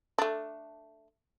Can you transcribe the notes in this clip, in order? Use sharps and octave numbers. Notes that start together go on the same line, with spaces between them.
A3 D4